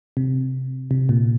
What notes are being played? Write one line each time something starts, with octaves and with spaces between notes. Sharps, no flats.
C3
C3
A#2